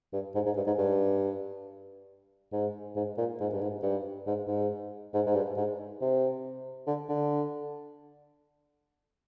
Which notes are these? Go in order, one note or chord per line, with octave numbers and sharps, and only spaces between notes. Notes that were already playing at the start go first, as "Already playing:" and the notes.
G2
G#2
G#2
G2
G#2
G2
G#2
G#2
A#2
G#2
G2
G#2
G2
G#2
G#2
G#2
G#2
G2
G#2
C3
D3
D3